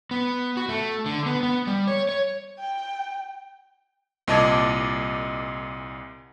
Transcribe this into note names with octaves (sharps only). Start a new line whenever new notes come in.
B3
F#4
A3
D3
B3
B3
G3
C#5
C#5
G5
C2 A#2 D#5 A5 D6 G#6